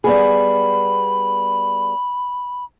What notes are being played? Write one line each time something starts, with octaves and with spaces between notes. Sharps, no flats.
G3 B3 G#4 B5